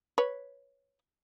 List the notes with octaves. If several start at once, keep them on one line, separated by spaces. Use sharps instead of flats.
B4 C#5